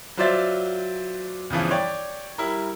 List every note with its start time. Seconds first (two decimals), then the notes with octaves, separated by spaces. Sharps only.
0.17 F#3 F4 C5 D5 E5 A6
1.50 E2 G2 C#3 E3 F3
1.71 C#5 D5 G5
2.38 G3 E4 A#4